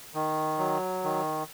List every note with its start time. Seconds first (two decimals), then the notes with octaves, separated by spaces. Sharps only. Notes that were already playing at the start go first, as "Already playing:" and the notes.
0.14 D#3
0.58 F#3
1.04 D#3